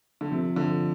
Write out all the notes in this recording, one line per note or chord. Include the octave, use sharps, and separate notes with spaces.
D3
C3 F3
D3